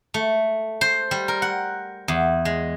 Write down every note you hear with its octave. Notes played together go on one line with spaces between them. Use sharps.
A3
C5
G3
A#4
F#5
E2
G#3